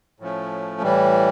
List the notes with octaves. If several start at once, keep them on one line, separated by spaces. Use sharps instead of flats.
A2 F3 A3 C#4
A2 E3 G3